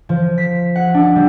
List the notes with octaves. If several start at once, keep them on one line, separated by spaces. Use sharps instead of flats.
F3
B6
F#5
D4
G3